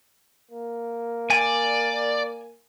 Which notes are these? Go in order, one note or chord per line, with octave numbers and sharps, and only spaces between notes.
A#3
D5 G#5